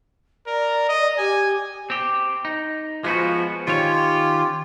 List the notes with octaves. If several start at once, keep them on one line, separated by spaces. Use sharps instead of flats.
A#4 D5
D#5
G4 G#5
C4 G4
D#4
F3 G#3 B3 F#4
D#3 C#4 F4 G4 C#5